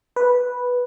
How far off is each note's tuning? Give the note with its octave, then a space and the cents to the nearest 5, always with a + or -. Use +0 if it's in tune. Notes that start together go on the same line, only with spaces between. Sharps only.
B4 -5